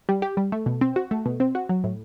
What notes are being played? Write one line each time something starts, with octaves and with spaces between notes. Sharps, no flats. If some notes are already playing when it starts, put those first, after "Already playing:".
G3
G4
G3
A3
B2
C4
F#4
A3
B2
C4
F#4
F#3
A2